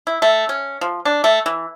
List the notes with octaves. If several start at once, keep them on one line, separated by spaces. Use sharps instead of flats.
E4
A3
C#4
F3
D4
A3
E3